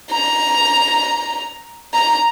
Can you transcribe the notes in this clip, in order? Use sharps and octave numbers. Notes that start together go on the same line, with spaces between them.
A#5
A#5